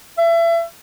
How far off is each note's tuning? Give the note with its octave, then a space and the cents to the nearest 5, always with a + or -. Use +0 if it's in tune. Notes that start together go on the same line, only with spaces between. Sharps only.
E5 +30